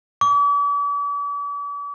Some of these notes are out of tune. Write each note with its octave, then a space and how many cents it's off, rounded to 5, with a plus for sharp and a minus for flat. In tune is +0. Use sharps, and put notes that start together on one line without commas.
D6 -45